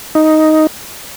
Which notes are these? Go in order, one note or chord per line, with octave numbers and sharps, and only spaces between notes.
D#4